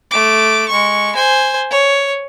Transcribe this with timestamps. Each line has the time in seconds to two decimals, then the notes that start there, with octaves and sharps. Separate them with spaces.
0.11 A3 D6
0.69 G#3 C#6
1.15 C5 G#5
1.71 C#5